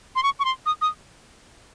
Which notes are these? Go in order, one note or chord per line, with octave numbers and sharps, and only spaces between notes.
C6
C#6
C#6
C6
D#6
D#6